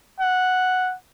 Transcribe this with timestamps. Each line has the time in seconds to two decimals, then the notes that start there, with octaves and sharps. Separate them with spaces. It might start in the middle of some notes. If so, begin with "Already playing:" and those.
0.20 F#5